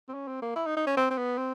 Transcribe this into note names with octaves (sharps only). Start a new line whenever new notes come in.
C4
C#4
C4
A#3
E4
D#4
D#4
C#4
C4
C4
B3
C4